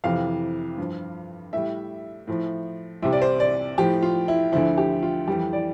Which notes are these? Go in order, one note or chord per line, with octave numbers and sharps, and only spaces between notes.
F2 C3 E3 F5
G2 F3
A2 G3 E5
A2 F3
C2 C3 G3 E5
D5
C5
D5
A2 F3 G4
F4
E4
D2 D3 F3 E4
G4
F4
F2 E3 G3 G4
D5